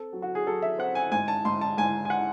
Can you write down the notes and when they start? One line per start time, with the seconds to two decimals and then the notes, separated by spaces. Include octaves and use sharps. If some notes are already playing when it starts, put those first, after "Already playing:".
Already playing: C4 A4
0.13 F#3
0.22 F#4
0.35 G#4
0.46 F#3 A4
0.62 E5
0.78 C4 F#5
0.95 G#5
1.12 G#2 G#5
1.28 A5
1.45 G#2 C6
1.61 A5
1.77 G#2 G#5
2.05 G#5
2.10 F#5